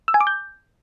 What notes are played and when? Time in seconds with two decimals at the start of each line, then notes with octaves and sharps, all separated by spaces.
0.08 E6
0.14 G#5
0.21 D6
0.27 G6